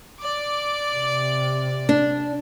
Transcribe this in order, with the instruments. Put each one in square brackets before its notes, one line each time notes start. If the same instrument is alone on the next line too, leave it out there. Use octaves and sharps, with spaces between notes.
[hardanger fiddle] D5 D6
[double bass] C3
[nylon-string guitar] D4